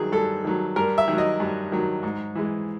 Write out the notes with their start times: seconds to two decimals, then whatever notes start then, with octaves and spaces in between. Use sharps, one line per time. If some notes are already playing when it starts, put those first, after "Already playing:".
Already playing: G2 D#3 F#3 G#4
0.12 G2 A4
0.44 D#3 F#3
0.76 G2 A#4
0.98 E5
1.08 D#3 F#3
1.18 D#5
1.40 G2
1.72 D#3 F#3
2.03 G#2
2.35 E3 G#3